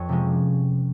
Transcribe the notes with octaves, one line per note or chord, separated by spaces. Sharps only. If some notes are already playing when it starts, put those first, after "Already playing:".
Already playing: F2 C#5
C3 F3 G#3 C#4